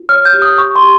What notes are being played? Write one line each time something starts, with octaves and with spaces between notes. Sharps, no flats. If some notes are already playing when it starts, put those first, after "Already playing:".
Already playing: F4
C#5 F6
G6
G4
D#6
G4 C#6
C6
G4